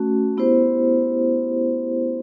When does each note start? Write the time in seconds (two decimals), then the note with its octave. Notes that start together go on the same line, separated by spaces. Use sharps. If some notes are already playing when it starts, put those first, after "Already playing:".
Already playing: A3 C#4 F#4
0.37 B3 E4 G4 C5